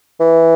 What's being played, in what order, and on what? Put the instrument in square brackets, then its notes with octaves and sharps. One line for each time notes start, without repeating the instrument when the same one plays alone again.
[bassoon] E3